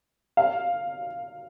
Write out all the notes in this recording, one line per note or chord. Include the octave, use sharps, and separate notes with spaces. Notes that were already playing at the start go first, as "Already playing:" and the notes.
F5